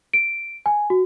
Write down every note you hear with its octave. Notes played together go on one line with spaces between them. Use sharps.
D7
G#5
F#4